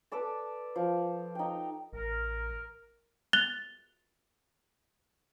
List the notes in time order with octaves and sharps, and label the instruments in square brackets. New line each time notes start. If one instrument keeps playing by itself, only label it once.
[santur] A4 B4 D5 A5
F3
D#4 G5
[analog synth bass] A1 [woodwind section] A#4
[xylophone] F#6 A6 F7 G7